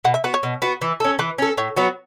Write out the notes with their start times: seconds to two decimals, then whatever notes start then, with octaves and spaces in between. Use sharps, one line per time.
0.04 B2 F#5
0.14 E5
0.24 B3 F#4 B4
0.34 C#5
0.43 B2
0.62 B3 F#4
0.82 E3
1.00 C#4 A4
1.19 E3 B4
1.38 C#4 A4
1.57 A2 C#5
1.77 F#3 B3 F#4